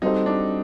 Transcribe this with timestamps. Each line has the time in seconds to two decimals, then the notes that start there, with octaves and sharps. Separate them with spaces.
0.02 G3 C4 D#4 F#4 A4 C5
0.26 D4